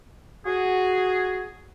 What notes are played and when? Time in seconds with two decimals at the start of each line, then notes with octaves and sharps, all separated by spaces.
0.45 F#4 G#4